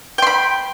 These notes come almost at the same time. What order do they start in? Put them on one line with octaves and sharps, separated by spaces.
G5 C6 B5